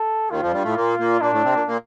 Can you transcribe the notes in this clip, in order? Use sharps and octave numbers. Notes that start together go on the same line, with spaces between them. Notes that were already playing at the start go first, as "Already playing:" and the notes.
Already playing: A4
D#2 D#3 F4
F2 F3
G2 G3
A2 A3
A#2 A#3
A#2 A#3
A#2 A#3 D4
A2 A3
C3 C4
A#2 A#3
A#2 A#3